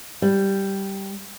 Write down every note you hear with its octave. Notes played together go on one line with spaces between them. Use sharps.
G3